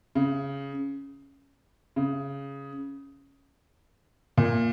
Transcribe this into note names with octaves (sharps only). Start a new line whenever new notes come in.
C#3
C#3
A#2